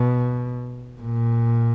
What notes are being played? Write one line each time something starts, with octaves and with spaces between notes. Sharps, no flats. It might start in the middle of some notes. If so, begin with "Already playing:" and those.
Already playing: B2
A#2